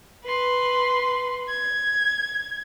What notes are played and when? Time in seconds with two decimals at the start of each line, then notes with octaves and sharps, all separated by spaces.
0.24 B4 C6
1.49 G#6